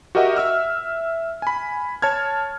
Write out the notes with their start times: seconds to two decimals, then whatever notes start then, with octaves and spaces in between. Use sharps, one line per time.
0.15 F#4 G4 A#4 D#5 E5 F#5
0.36 E5 E6 F6
1.42 G#5 B5
2.02 C#5 A5 F6 G#6